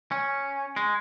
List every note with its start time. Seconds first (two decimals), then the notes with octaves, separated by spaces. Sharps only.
0.12 C#4
0.76 G#3